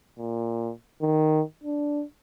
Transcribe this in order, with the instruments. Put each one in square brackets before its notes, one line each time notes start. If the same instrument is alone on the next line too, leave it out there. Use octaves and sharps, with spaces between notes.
[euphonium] A#2
D#3
D4